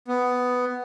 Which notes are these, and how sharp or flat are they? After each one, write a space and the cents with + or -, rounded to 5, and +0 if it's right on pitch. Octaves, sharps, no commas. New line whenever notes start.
B3 +10